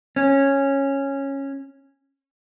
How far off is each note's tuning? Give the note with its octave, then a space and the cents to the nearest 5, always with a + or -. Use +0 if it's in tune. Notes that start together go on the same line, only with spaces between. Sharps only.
C#4 -10